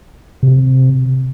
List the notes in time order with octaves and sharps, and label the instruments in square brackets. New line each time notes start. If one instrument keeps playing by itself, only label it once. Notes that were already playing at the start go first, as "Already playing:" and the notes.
[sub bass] C3